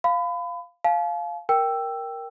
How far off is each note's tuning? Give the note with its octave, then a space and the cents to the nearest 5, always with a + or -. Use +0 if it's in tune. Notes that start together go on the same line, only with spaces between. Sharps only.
F5 +0 B5 +30
F5 +0 A5 -45
A#4 +5 G5 +0 E6 +10